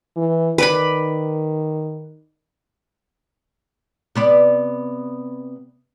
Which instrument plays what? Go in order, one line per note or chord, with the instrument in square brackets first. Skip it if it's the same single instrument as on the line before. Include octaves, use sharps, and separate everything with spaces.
[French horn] E3
[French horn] D#3 [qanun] B4 D5 B5
[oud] C3 B3 D5